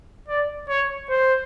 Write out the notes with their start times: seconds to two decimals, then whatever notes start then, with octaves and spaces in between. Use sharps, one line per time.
0.28 D5
0.69 C#5
1.10 C5